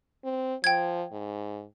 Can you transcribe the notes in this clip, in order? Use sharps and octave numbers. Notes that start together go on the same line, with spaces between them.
C4
F3 G5 G#6
G#2